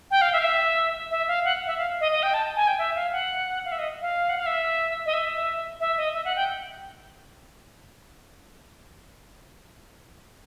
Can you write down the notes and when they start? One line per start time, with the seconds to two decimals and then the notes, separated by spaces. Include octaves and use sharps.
0.11 G5
0.21 F5
0.33 E5
0.39 F5
0.44 E5
1.11 E5
1.28 F5
1.45 F#5
1.67 E5
1.78 F5
2.01 D#5
2.12 D#5
2.23 G5
2.34 A5
2.56 G#5
2.67 G5
2.78 E5
2.95 F5
3.12 F#5
3.65 F5
3.72 E5
3.79 D#5
4.02 F5
4.29 F#5
4.38 F5
4.46 E5
5.06 D#5
5.13 E5
5.80 E5
5.97 D#5
6.13 E5
6.25 F#5
6.36 G5